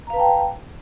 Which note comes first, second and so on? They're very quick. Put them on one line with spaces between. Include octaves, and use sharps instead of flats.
A#5 F5 B4 A5 G5